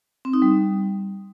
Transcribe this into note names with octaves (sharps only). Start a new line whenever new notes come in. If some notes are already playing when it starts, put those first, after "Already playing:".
C4
D#4
G3